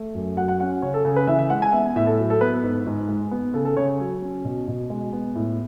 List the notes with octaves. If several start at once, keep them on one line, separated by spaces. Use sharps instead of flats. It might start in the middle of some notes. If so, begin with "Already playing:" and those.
Already playing: A3
F#2
F#3 F#5
F#5
C#4 F#5
C#3 C#5
A4
C#3 A4
B4
E3 E5
E5
G#3 F#5
G#5
B3 E5
A2 E5
A4
F#3
A4
B3 B4
G#2
G#2
G#3
B3
C#3 A4
A4
C#3 C#5
F#3
C#4
B2
B2
G#3
B3
A2